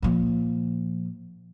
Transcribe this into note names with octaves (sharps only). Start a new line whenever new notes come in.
A#2 F3